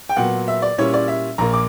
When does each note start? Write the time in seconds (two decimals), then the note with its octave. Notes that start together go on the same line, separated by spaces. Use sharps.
0.09 G5
0.16 A#2 F#3 B3 F#5
0.48 E5
0.62 D5
0.78 A#2 G3 C#4 E4 C#5
0.93 D5
1.08 E5
1.38 A#1 A#2 A#3 A#5
1.54 D6